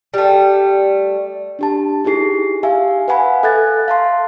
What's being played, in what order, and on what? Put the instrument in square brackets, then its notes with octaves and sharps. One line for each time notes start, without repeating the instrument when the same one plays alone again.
[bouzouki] G3 A3
[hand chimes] D4 G4 A5
D#4 E4 G4 G#4 C7
G4 E5 F5 G#5
B4 F5 F#5 G#5 B5
A4 E5 F#6 G#6 A6
F5 A5 C6